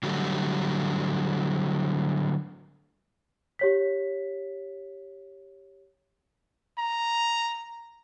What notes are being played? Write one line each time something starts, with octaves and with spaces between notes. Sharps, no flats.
D3 F#3 G3 A3
G4 C#5 B6
A#5